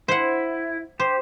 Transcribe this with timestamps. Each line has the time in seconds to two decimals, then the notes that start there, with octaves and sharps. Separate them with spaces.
0.08 E4 C5 F#5
1.00 G4 C5